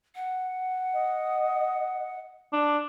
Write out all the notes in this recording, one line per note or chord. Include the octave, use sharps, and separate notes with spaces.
F#5
D#5
D4